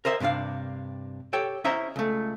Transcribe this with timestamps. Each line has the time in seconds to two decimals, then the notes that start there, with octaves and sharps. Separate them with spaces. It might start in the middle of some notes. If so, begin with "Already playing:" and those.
0.05 A#4 C5 D#5 E5
0.20 G2 C3 F#3 D4 F5
1.33 G4 A4 C#5 G5
1.64 C#4 E4 C5 D#5 E5 A#5
1.96 C#2 A3